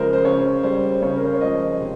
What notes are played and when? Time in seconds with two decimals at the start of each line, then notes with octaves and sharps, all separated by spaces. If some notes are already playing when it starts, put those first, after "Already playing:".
Already playing: C#3 F3 G#3 A#4 C5
0.13 C5
0.25 C#3 C#5
0.63 G3 C5
1.02 C#3 C#5
1.16 A#4
1.25 C5
1.34 C#5
1.41 F3 G#3 D#5
1.80 C3